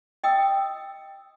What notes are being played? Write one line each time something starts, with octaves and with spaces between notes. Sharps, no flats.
D#5 G5 D#6 E6